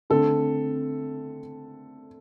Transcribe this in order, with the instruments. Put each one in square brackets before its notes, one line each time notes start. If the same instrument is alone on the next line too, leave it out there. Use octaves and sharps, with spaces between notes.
[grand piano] D3 A3 C4 A4